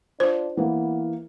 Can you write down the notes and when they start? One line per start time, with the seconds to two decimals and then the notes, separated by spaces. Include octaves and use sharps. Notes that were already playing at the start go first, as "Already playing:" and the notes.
0.20 D4 F4 C5
0.57 E3 A#3 B3